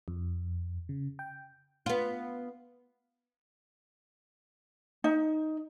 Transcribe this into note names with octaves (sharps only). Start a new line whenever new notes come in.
F2
C#3
G5
B3 F4
D#4